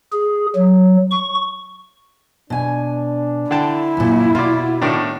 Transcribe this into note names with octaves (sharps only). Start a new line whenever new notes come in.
G#4
F#3
C#6
B2 D4 G#5
D3 E4 G5 A5
F#2 A#2
B2 F4 F#4 D5
A2 D#3 D4